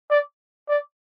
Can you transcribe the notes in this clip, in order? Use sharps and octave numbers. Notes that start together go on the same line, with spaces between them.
D5
D5